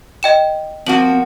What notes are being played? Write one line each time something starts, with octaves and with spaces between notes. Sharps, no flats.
D#5 G5 E7
F3 A#3 C4 F#4 F#7